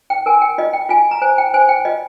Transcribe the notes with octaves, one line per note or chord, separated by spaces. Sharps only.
G5
A#4 G#5
G5
F4 D#5
G5
F4 G#5
A#5
C5 G#5
G5
C5 G#5
G5
F4 D#5